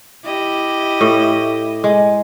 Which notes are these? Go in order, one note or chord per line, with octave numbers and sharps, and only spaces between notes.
E4 G4 D#5
A2
G#3